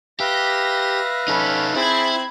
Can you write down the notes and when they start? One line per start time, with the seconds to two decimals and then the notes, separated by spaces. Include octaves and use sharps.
0.20 G4 B4 E5 F5 A#6
1.28 C#4 D#4 A4 B5
1.75 C4 E4 G#4 A5 B5 F#6 G#6